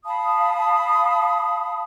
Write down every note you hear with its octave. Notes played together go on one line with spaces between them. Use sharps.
F5 A5 B5 D#6